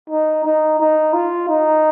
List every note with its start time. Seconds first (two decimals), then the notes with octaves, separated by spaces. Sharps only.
0.10 D#4
0.45 D#4
0.80 D#4
1.13 F4
1.48 D#4